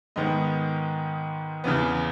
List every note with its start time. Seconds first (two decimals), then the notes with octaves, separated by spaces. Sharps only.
0.16 G#2 D#3 G#3 B3 D#5
1.64 E2 C#3 E3 B3